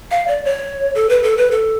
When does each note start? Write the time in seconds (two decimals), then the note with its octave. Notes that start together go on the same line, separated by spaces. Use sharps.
0.11 F5
0.28 D5
0.45 C#5
0.95 A4
1.09 B4
1.23 A4
1.37 B4
1.51 A4